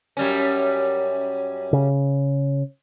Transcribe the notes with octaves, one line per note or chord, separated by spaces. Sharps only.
F#2 G3 C#4
C#3